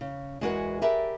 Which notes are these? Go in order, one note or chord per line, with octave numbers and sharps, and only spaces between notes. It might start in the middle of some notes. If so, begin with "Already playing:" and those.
C#3
E2 G#3 F#4 A#4 B4 F#5
G4 G#4 A#4 B4 D5 E5